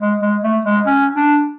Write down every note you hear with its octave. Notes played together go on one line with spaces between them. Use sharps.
G#3
G#3
A3
G#3
C#4
D4